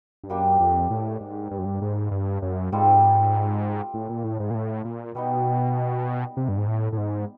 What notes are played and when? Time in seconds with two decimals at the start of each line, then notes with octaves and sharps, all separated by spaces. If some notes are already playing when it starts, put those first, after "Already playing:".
0.24 G2
0.29 F#2 G3 A#3 D4 G4
0.60 F2
0.90 A2
1.21 G#2
1.51 G2
1.59 F#2
1.65 G2
1.81 G#2
2.11 G2
2.42 F#2
2.72 G#2 G3 C4 F4 A4
3.94 A2
4.09 A#2
4.24 A2
4.40 G#2
4.50 A#2
4.55 A2
4.85 A#2
5.15 B2 G3 B3 D#4
6.37 C3
6.49 G2
6.58 G#2
6.67 A2
6.93 A2
6.98 G#2